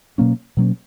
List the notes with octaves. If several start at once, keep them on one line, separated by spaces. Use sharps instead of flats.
B2 F#3 A#3 C#4
B2 F#3 A#3 C#4